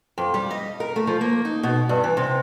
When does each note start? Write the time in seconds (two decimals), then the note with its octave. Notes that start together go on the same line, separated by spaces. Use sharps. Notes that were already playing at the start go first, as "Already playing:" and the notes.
0.18 F2
0.34 G3
0.51 D#5
0.80 A#4
0.96 A3
1.07 F3
1.21 A#3
1.45 D#4
1.63 B2
1.89 G2
2.04 E3
2.17 C3